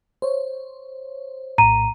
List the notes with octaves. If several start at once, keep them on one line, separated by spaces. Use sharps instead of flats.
C5 C#5
A#1 A2 A#5 D#7